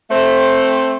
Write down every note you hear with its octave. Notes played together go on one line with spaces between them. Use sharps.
A3 C4